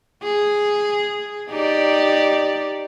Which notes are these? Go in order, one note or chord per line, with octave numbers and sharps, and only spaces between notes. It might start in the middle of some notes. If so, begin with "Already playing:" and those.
G#4
D#4 G4 D5